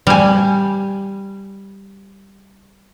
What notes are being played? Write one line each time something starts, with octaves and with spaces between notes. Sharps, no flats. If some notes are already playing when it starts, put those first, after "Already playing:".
G3 G#5